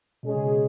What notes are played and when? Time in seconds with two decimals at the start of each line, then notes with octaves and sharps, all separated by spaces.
0.23 B2 G#3 C#4 G#4
0.35 C#3
0.46 B2